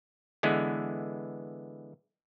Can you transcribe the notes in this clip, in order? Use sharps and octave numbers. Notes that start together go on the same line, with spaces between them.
D3 E3 G#3 B3